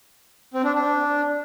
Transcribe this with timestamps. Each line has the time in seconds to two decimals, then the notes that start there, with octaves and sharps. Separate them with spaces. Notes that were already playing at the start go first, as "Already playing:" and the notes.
0.54 C4
0.64 D4
0.74 D4